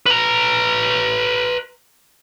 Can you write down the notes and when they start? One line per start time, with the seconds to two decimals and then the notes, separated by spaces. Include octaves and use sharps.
0.06 B4 A#5